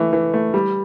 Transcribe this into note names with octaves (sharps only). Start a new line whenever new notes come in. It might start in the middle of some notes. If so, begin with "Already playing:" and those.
Already playing: E3 A3
E3
A3
G3